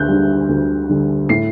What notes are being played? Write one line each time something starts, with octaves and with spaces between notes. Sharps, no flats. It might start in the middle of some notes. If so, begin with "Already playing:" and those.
Already playing: D2 F#6 G6
D3 G3
D2
D3 G3
A2 C7